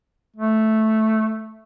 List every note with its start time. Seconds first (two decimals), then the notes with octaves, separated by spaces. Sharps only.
0.36 A3